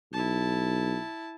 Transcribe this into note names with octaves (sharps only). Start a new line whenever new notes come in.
B1 E4 A5